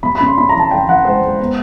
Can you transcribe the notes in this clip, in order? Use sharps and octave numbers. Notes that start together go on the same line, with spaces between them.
C3 B5
B5
C#4
C6
C#4 B5
A#5
E3
A5
E3 G5
E3 F#5
G#3 C5
G#3
B3